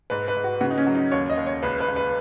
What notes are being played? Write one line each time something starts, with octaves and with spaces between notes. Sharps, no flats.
G#2 B4
B4
G#2
F#4
C#3 F#4
D#4
C#4
F#3
D#4
D#2 C#5
D#5
D#2
C#5
C#2 B4
B4
C#2
B4